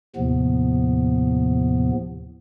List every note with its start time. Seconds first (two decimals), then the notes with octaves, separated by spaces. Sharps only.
0.16 D#2 A2 C3 F3 B3